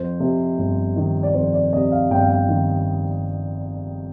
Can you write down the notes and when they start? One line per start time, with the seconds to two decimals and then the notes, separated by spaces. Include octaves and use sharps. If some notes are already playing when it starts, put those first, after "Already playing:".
Already playing: F2 C5
0.20 C3
0.58 G1
0.96 D#3
1.23 D5
1.34 F2 C5
1.54 D5
1.73 C3 D#5
1.92 F5
2.10 G1 G5
2.20 F5
2.29 G5
2.49 D#3